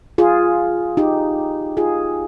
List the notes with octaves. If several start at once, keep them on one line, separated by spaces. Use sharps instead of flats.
F4 G#4
D#4 G4
F4 G#4